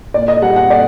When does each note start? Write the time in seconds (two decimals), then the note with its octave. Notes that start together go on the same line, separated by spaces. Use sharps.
0.14 A#2 D5
0.28 D#5
0.42 G3 F#5
0.56 F#5
0.70 A#2 D5